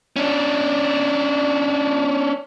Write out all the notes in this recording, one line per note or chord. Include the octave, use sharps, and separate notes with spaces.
C#4 D4